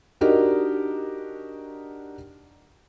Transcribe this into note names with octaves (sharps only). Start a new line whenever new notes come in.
D4 D#4 F#4 G4 A#4 D#5